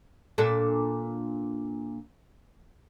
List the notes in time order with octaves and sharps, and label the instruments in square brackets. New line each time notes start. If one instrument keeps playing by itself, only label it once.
[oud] A#2 D4 A4